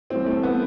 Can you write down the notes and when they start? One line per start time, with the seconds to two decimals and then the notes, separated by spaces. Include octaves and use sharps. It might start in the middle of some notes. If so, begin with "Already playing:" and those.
0.10 A2 E3 G3 C4
0.26 A3
0.43 B3